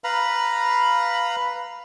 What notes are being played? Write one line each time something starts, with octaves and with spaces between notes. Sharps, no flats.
B4 F5 A#5 B5